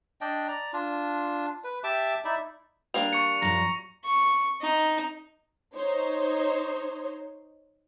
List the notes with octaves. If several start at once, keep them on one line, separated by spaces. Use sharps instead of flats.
D4 D5 D#5 G5
D5 A#5
D4 F4
B4
G4 E5 A5 D6
D#4 E4 D5 E5
G3 A#3 D4 F7
C#6 C#7
F#2 F3 A#5
C#6
D#4
D#4 C5 C#5